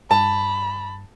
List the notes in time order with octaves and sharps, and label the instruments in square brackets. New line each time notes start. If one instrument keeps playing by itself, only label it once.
[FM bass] G2 [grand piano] A5 [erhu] B5